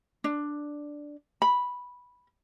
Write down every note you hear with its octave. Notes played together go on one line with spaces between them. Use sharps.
D4
B5